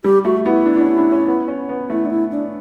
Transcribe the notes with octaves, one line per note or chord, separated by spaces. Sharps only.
G3 G4
A3 F#4
B3 E4
D4
D4
C#4
D4
C#4
B3
C#4
B3
A3 E4
D4
E4
D4